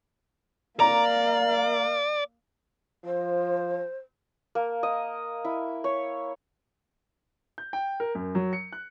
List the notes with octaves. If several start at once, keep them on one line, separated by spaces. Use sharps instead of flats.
A#3 D5 F5 A#5
F3 C5
A#3
D#5
E4
C#5
G6
G5
A#4
F#2
F#3
C#7
F#6